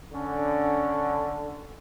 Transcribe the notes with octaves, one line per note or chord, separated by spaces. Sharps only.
D3 C#4